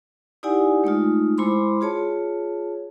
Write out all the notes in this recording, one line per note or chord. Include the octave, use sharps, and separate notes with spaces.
D#4 E4 G4 D5 F#5 G#5
G#3 A3 D#4 F4
G#3 E4 C5 B5 C6 D6
F4 G#4 C#5 A5